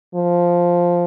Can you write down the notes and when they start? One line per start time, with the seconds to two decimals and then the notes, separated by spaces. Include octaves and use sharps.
0.15 F3